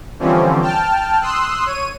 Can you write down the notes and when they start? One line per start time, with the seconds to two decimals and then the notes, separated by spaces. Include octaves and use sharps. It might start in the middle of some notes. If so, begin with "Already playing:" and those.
0.19 D3 E3 F3 G3 C4 C#4
0.61 G5 A5 F6
1.21 C6 D#6 E6 F#6
1.66 C#5 D#7